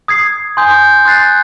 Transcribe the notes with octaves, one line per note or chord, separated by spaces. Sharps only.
D#6 G#6 C7
G#5 C6 D#6 G6
C6 D#6 F#6 A6 C7